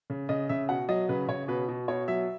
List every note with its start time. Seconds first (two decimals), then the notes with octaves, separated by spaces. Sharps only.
0.10 C#3
0.29 C#3 D#5
0.49 C#3 E5
0.69 B2 F#5
0.89 F#3 D#5
1.09 C#3 B4
1.28 C#3 C#5
1.48 B2 B4
1.68 B2
1.88 B2 C#5
2.08 F#3 E5